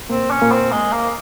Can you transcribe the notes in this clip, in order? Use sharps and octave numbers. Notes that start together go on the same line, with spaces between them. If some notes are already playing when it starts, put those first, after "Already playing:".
A#2 A#3 C4
C#4
A#2 A#3
C4
G#3
A#3